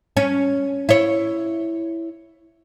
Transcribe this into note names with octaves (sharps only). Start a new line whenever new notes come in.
C#4
E4 C#5